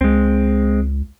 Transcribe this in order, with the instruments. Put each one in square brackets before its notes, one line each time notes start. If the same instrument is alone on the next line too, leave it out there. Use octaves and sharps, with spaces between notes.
[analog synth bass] C#2 [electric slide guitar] G#3 C4